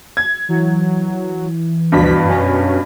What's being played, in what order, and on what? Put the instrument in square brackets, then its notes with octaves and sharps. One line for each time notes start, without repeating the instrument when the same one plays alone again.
[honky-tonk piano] G#6
[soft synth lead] E3 [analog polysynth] F#3
[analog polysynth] D2 F3 B6 [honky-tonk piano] G2 B2
[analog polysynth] F#2 C#4